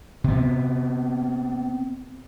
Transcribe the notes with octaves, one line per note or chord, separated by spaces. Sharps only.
C3 B3